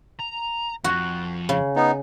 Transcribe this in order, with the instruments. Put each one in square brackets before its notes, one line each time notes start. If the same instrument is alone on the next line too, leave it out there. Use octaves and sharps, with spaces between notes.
[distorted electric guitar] A#5
[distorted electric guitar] F2 F3 [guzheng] F#4
[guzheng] C#3
[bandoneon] B3 D#4